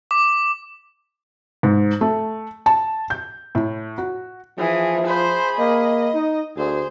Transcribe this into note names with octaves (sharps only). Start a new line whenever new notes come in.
D6
G#2
A3
A5
G6
A2
F#4
E3 F3 G#4
G#4 C5 B5
A#3 D#5
D#4
D2 G#4 C5